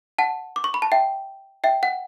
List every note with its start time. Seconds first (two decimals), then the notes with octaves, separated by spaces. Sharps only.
0.18 F#5 A5
0.56 D6
0.64 C#6
0.74 B5
0.82 A5
0.92 E5 G5
1.64 E5 G5
1.83 F#5